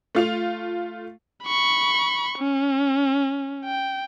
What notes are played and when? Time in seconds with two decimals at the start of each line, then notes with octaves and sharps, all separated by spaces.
0.15 A3 F4 F7
1.45 B5 C#6
2.38 C#4
3.65 G5